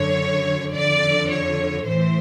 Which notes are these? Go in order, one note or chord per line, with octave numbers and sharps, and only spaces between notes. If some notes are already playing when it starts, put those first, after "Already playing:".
Already playing: F#2 D3 C#5
F2 D3 D5
C#5
A2 E3 C5